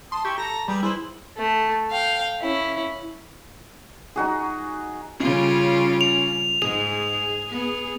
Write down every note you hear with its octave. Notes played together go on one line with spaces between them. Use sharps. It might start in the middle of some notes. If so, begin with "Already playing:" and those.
A5 C6 D#6
E4 G4 G5 C#6
A4 A#5 A#6
G3 G4 G#4 B4
E4 G#4 B4 C5
A3
F5 G5
C#4 E4
D#4 F#4 G#4
C#3 G3 C#4 F4
F7
G#2 G#4 F7
B3